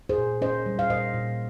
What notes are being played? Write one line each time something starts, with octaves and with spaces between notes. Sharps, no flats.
G#4 C5
A#2
C#4 C5 D#5
G3
F5
A#2 C5 D#5
A#2